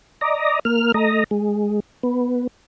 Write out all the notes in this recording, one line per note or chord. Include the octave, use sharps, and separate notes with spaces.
D5 D#5 A#5
A#3 F6
A3 D#5 A#5
G#3
B3